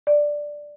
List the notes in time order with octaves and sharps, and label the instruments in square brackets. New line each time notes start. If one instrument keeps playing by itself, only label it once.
[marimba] D5